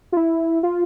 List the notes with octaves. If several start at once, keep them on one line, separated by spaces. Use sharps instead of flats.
F4
E4
F4